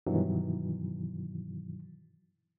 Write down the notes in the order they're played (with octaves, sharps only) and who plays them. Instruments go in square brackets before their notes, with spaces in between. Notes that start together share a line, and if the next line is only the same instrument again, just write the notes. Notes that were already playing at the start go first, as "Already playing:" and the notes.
[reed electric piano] G2 B2 D#3 E3 F#3